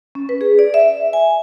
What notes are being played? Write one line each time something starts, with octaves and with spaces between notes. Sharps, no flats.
C#4
B4
G#4
D5
E5
G#5